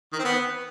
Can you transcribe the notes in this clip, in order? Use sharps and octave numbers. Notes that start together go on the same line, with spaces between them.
D#3
C4
B3